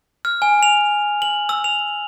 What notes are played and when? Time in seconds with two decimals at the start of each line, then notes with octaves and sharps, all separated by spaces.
0.25 F6
0.42 G#5
0.63 F7
1.22 F#7
1.49 E6
1.64 F7